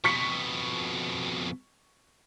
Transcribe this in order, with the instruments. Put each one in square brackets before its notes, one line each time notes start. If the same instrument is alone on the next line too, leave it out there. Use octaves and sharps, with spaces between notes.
[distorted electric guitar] F2 B2 [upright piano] C#6 B6 C#7